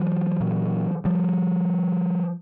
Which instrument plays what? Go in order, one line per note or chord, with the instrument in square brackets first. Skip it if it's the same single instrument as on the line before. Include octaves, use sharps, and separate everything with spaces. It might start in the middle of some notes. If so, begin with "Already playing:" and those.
Already playing: [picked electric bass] E3 F#3
A#2
F3 G3